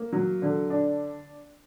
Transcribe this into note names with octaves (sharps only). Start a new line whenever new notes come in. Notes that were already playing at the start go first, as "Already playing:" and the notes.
Already playing: A#3
F#3
D3
D4